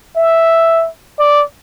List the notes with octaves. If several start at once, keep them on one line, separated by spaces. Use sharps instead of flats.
E5
D5